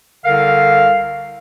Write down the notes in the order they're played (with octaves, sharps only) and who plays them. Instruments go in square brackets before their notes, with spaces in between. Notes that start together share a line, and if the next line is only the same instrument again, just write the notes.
[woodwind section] C2 D3 A#4 F5